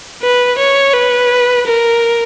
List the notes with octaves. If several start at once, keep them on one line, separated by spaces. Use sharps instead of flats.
B4
C#5
B4
A#4